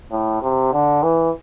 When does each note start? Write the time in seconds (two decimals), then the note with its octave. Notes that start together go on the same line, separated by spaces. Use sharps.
0.12 A2
0.43 C3
0.73 D3
1.03 E3